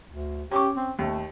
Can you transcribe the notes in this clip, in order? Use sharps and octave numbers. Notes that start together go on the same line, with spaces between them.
D2
C#4 G4 C#6 D6
C4
D#2 A3